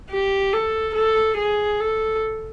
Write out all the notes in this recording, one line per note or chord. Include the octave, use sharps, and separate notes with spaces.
G4
A4
A4
G#4
A4